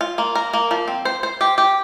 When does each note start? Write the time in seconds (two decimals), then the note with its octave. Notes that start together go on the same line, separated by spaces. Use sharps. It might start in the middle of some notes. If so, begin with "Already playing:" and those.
0.01 F4
0.18 A#3
0.35 A#4
0.53 A#3
0.71 F3
0.88 C4
1.05 C5
1.23 C5
1.41 G4
1.58 G4